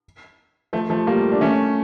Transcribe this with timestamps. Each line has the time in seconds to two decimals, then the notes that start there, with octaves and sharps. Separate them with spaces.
0.73 F3 A3
0.90 F3 A3
1.07 G3 A#3
1.32 D4
1.41 A3 C#4